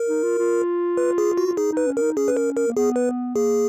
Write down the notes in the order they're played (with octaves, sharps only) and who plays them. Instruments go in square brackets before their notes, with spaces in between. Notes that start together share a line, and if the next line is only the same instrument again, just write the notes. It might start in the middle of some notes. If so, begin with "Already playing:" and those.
Already playing: [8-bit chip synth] A#4
[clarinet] D#4
F4
F4
[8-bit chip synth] B4
G#4
F#4
[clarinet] F4
[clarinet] D#4 [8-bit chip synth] G#4
[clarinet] D#4 [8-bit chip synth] B4
[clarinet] C#4
[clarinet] C#4 [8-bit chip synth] A#4
[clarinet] D#4
[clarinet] C#4 [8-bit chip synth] G#4
[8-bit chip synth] B4
A#4
A#4
[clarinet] A#3
[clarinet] B3 [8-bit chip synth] G#4
[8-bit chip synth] B4
[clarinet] A#3 [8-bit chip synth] G#4